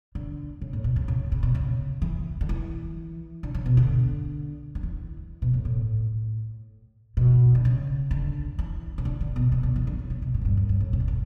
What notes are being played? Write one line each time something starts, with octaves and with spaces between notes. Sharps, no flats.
D3
C#3
A2
B2
C#3
C#3
C#3
B2
C#3
E3
D3
E3
D3
C#3
B2
D3
D3
E3
B2
A2
A2
B2
D3
C#3
D3
E3
C#3
D3
D3
B2
B2
D3
E3
D3
C#3
C#3
B2
A2
F#2
G2
F#2
G2
A2
C#3
D3
C#3